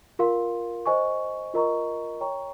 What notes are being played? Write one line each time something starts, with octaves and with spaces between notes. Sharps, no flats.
F4 A#4 F5 C6
C5 D#5 G#5 C#6
F4 A#4 D#5 A#5 C#6
C#5 G5 A#5 C#6